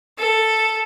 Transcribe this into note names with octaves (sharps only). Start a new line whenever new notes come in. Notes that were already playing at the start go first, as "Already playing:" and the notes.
A4